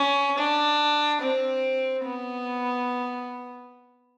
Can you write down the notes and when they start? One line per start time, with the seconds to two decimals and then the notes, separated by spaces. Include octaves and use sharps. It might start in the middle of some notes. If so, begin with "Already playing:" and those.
Already playing: C#4
0.38 D4
1.21 C4
2.04 B3